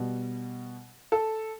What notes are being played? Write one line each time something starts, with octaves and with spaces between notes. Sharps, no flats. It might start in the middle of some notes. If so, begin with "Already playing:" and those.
Already playing: B2 G3
A4